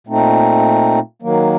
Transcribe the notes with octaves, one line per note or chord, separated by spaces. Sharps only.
A#2 A3 C4 D#4
D#3 F#3 A#3